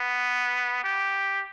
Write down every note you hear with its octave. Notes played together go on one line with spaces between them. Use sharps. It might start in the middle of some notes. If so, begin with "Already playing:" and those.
Already playing: B3
G4